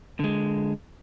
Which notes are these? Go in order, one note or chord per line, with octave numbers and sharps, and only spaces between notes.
D3 G#3